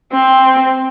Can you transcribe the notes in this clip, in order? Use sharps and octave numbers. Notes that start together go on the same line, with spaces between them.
C4